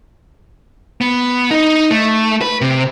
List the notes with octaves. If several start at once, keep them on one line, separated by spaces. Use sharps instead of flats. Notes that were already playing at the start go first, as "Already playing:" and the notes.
B3
D#4
A3
B4
C3